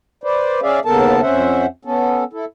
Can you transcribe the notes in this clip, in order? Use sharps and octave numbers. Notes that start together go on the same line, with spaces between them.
B4 C5 D5
C#4 G#4 D5 E5 F5
D#2 C#3 B3 A4 A#4 A5
F2 C#4 C5 E5 F#5
B3 C#4 A4
E4 A4